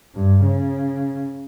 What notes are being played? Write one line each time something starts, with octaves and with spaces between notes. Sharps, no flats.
G2
C#3